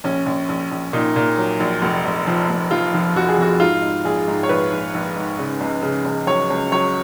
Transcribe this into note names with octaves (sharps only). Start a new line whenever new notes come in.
A#1 C#4
A#1
A#1
A#1
A#2 D#4
A#2
F#3
A#1
F1
F1
F3
F1
F3 F4
F3
F2 F#4
G#4
F2 F#4
G#2 F4
G#2
A#1 G#4
G#2
C#5
A#1 B4
A#1
A#1
G#2
C#3
C#2
C#3
C#2
F#3 C#5
C#2
F#3 C#5